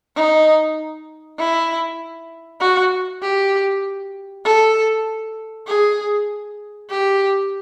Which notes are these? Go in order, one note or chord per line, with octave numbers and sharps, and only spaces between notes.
D#4
E4
F#4
G4
A4
G#4
G4